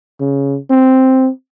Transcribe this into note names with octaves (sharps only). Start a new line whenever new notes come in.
C#3
C4